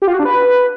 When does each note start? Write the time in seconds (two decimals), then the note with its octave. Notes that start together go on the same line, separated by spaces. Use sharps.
0.02 G4
0.08 F4
0.13 F#4
0.19 D4
0.25 B4